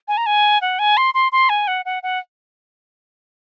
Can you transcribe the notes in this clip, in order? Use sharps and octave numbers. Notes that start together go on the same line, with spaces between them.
G#5
A#5
G#5
F#5
G#5
C6
C6
C6
G#5
F#5
F#5
F#5